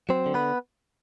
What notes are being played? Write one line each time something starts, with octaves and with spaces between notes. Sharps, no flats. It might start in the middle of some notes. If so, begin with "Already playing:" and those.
F#3 C4 C5
D3
B3 B4